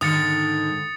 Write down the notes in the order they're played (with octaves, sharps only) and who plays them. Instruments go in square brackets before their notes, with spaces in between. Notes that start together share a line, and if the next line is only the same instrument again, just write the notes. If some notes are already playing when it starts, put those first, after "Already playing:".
[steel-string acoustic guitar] G#2 D3 D#3 [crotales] D#6 A6 C#7